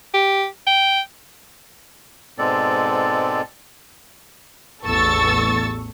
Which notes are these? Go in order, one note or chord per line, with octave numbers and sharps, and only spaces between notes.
G4
G5
G#2 B2 G#3 C4 A4 D5
A1 E2 A4 C#6 E6 A6